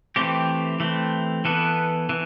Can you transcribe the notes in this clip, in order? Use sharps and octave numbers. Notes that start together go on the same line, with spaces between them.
E3 A3 C4 G4
E3 A3 C4
E3 B3 A4
E3